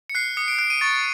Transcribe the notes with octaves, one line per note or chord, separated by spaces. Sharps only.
C#7
F#6 C7
D#6 C#7
D7
F#6 D7
D#7
C#6 A6